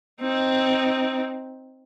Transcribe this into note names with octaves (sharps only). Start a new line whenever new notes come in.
C4 D#4